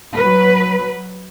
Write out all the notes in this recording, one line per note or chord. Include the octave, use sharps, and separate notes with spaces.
F#3 B4